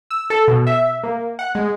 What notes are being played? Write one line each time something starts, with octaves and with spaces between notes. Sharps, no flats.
E6
A4
B2
E5
A#3
F#5
G#3